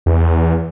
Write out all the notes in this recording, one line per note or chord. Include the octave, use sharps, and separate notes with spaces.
E2